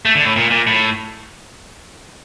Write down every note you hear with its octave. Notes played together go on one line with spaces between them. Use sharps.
A3
D3
A2
A#2
A#2
A2